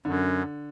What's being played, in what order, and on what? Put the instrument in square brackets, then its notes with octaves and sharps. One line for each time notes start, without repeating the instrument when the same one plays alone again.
[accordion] F#2 [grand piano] D3